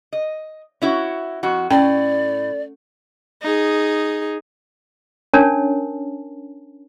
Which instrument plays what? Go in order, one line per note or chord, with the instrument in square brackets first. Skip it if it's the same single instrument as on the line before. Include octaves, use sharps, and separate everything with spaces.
[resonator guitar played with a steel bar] D#5
C#4 E4 F#4
F2 F#4
[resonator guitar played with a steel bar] A2 [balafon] C#4 G5 [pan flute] D5
[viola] D#4 G#4
[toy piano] C#4 D4 A#4 C#5 G#5 A5